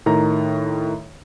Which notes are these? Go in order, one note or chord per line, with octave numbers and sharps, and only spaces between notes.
A2 D#3 A#5